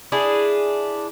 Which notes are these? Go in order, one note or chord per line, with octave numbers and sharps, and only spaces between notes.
D4 E4 G#4